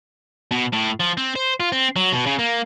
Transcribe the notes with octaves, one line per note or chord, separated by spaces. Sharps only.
B2
A2
F3
C4
C5
F4
C4
F#3
B2
C#3
A#3